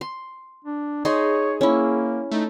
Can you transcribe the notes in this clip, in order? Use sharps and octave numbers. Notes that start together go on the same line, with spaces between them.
C6
D4
D#4 G#4 C#5 C6
A#3 C#4 E4
A3 D#4